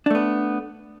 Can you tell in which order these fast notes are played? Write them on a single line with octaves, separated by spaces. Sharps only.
D4 A3 B3